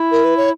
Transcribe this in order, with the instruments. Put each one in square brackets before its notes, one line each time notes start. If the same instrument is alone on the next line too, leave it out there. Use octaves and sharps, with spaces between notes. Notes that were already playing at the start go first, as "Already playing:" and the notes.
Already playing: [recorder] E4
[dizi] A#4
B4
C#5